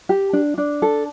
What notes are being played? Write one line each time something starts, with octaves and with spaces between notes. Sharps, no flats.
G4
D4
D4
A4